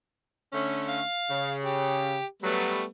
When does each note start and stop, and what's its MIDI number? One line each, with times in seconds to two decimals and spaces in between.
0.53 1.01 50
0.53 1.01 57
0.53 1.01 61
0.89 1.52 77
1.30 2.16 49
1.64 2.25 67
2.43 2.73 54
2.43 2.85 55
2.43 2.85 57
2.43 2.85 59
2.43 2.73 71